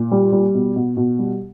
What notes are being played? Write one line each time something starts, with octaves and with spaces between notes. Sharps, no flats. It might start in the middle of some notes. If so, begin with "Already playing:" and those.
Already playing: A#2
G3
G3
B2
B2
B2
G3